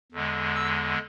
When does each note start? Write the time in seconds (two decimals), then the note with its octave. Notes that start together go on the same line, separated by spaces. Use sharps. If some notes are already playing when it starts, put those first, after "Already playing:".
0.12 E2 D3 G#3
0.55 E6